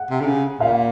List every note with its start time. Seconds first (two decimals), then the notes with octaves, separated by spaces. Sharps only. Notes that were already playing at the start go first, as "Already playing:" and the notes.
Already playing: F#5
0.10 C3
0.20 D3
0.26 C#3
0.60 A#2 F5